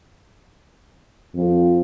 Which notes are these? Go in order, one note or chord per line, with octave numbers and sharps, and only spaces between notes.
F2